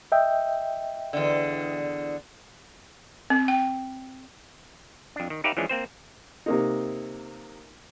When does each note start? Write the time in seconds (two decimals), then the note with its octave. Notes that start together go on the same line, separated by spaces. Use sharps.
0.12 D#5 E5 G5
1.13 E2 D3
3.30 C4
3.48 G5
5.16 F2 D4
5.30 D#3
5.44 D#4 G4 B4 D5 E5 F5
5.57 E3 F3 G#3 C#4 D4
5.69 A#3 C4 C5
6.46 C3 A#3 D#4